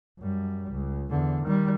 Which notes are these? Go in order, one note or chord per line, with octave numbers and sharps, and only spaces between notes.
F#2 G3
C#2
E2 D3
D#3 G3